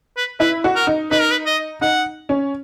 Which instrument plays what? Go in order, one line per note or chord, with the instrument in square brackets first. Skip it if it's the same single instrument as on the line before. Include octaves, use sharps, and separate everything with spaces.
[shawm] B4
[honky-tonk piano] E4 [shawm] B4
[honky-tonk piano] F#4
[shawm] A#4
[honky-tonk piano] D#4
[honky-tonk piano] D#4 [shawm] B4
[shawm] A#4
B4
D#5
[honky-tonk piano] D#4 [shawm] F#5
[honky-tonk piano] C#4